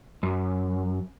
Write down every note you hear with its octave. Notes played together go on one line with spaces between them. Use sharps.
F#2